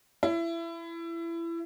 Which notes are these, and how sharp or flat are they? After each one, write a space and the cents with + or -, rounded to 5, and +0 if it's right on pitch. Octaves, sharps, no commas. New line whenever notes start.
E4 +25